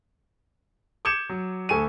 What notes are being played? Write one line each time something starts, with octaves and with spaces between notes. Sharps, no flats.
D6 G6 G#6 C#7 E7
F#3
D2 A4 G#5 C#6 D#7